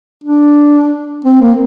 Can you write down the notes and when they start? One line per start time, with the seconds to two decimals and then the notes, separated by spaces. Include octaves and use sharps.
0.24 D4
1.25 C4
1.41 A#3